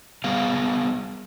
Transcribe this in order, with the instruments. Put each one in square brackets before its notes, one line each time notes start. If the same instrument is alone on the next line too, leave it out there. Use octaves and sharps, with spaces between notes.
[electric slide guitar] G3 B3 G#4 F5